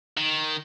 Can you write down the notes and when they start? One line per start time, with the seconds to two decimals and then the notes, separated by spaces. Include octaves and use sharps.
0.17 D#3